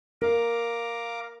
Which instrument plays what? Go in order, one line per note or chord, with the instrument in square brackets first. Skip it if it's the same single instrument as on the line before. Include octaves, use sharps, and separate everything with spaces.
[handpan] A#4 [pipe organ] F5 A#5 D6